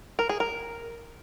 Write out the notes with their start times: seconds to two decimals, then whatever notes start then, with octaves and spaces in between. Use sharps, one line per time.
0.19 A#4
0.29 G#4
0.40 A#4